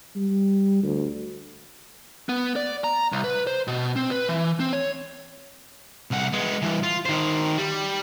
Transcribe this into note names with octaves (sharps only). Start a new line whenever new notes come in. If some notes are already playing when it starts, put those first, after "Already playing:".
G3
D2
B3
D5
A#5
C2
B4
C5
B2
C4
B4
E3
C4
C#5
C2 F#5
G#3 B3
G2 E3
F4
D#3 C5
G3